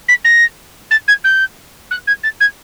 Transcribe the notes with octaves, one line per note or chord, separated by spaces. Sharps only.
B6
A#6
A6
G#6
G6
F#6
G#6
A6
G#6